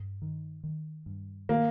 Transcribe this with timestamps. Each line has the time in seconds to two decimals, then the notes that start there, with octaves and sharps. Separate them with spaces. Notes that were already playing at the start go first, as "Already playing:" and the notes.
Already playing: G2
0.22 D#3
0.64 D#3
1.06 G2
1.49 D#3 A#3